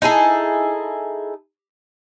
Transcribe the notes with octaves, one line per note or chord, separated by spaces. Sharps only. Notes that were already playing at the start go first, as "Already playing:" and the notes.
D#4 E4 G#4 A4